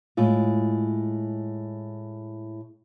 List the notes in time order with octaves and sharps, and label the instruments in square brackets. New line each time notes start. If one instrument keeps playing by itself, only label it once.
[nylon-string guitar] A2 G#3 F4